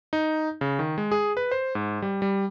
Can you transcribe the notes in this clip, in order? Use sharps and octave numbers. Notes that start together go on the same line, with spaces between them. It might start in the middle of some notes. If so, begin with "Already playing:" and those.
D#4
C#3
D#3
G#3
G#4
B4
C5
G#2
G3
G3